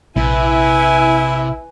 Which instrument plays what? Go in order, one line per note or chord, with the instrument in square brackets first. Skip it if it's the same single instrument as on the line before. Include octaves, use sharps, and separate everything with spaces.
[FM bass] A#1 [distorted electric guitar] C3 [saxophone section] E4 [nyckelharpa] B4 G#5